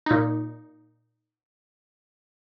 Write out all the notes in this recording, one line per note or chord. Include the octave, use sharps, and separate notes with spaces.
A#2 D#4